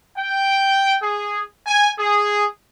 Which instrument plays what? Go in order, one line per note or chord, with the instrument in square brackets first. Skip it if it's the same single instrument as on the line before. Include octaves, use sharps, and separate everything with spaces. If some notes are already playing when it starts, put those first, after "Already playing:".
[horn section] G5
G#4
G#5
G#4